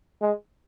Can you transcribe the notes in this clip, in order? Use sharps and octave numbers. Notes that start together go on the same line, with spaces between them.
G#3